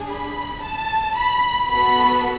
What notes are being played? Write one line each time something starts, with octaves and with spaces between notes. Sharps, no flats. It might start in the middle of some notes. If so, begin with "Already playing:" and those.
Already playing: D4 G#4
B5
A5
B5
B3 F#4 A4 B5